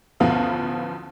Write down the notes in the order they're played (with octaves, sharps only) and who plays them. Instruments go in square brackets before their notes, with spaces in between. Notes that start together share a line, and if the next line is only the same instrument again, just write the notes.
[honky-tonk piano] A1 D2 F3 B3 F5